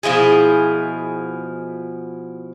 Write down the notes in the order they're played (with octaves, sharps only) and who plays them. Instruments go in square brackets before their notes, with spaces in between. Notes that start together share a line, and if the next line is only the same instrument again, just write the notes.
[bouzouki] B2 F3 E4 G#4